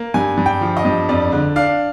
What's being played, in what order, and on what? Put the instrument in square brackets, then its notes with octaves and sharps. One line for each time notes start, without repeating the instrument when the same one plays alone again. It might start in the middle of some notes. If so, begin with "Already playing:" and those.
Already playing: [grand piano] A#3
G2 G#5
G2
G5
F3
D#5
G2
F2 D5
D3
D4 F5